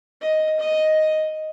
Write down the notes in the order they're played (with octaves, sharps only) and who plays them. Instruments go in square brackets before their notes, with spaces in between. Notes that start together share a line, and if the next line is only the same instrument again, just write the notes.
[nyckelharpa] D#5
D#5